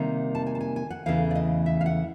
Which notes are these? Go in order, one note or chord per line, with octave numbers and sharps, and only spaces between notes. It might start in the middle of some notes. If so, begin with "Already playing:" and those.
Already playing: C3 D#3 G3 A#3 D#4
A5
G#5
A5
G#5
G#5
F#5
E2 C#3 E3 A3 F5
D5
D#5
E5
F5
F#5